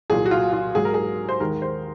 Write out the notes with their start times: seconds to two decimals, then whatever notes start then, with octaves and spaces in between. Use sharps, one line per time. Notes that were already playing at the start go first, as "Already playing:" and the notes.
0.10 C2 A#2 F#3 G#4
0.26 F#4
0.31 F4
0.53 F4
0.75 G#2 F#3 G#4
0.85 A#4
0.94 G#4
1.29 C5
1.40 D#2 D#3 G#3 A#4
1.62 C5